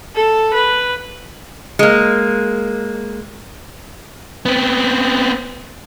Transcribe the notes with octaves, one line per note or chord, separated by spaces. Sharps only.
A4
B4
G#3 A#3
B3 C4